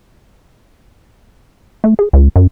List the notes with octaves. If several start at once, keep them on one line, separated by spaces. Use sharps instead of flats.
A3
G#4
C#2
F#2